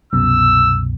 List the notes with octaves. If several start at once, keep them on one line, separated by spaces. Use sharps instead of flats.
C2 F#2 B2 E6